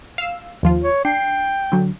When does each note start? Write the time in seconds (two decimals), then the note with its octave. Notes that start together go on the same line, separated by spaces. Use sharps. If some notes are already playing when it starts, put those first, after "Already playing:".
0.18 F5 E6
0.63 D#2 F3 F4
0.84 C#5
1.05 D4 G5 C7
1.72 D3 F#3